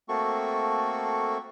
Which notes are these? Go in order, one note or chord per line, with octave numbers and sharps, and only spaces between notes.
A3 A#3 C4 F#4 A4 C#6